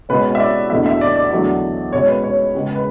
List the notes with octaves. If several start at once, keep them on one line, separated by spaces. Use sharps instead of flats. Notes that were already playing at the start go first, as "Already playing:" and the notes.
B2 G#3 C#4 B4
E5
D5
E2 B2 A3 D4 E5
E5
D5
D5
E2 D3 F#3 A3 D5
B2 G#3 C#4 C#5
B4
C#5
C#2 C#3 G#3 B3
B4